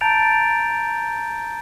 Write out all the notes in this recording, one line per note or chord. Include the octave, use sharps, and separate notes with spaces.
A5 A#5 G6 A6 D7 F7